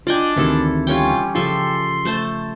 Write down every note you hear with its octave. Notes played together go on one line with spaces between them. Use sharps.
D4 F4 D5 D#5 G5 G#5
D2 C3 D#3 E3 E4 A4
G3 C#4 F4 G5
C#3 F3 F4 G4 A4 E5 C6
A3 C5 A5